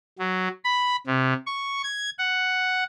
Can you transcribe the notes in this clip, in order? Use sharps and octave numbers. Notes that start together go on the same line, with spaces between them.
F#3
B5
C3
C#6
G#6
F#5